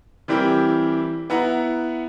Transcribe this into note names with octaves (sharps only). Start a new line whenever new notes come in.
E3 G3 C4 E4 G4 A#4
B3 E4 F#5 A#5